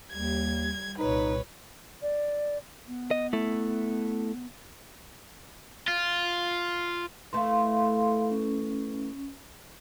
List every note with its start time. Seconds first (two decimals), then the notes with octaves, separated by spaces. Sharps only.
0.13 D#2 G3 G#6
0.98 C2 A#2 D#4 B4 C#5
2.02 D5
2.88 B3
3.11 D#5
3.33 A3 E4
5.88 F4
7.33 E3 A3 F5 C6
8.31 C#4